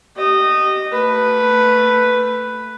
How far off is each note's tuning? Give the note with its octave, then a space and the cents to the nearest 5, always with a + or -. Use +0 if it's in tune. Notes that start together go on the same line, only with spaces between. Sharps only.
G4 -35 D#5 -15
A3 +20 B4 +0